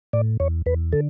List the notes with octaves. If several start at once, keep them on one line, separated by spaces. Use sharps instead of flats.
A2 D5
E2 C#5
E2 B4
D3 A4